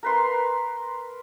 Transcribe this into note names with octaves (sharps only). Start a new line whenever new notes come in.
A#4 B4 C6